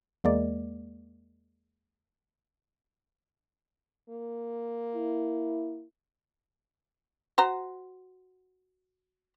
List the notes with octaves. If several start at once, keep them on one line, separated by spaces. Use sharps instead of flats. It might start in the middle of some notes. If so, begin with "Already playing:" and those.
E2 G#3 A#3 D5
A#3
E4
F#4 C5 A#5